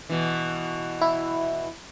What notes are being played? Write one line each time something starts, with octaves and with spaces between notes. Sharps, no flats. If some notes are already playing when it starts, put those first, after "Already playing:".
B2 E3
E4